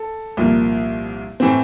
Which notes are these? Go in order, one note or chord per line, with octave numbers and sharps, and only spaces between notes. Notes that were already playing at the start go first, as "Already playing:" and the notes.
Already playing: A4
C2 A#2 F3 A#3
A2 E3 A3 C4 C5